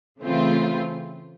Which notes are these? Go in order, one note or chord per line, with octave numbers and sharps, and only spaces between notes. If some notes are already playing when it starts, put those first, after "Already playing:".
C#3 E3 A3 C4 F4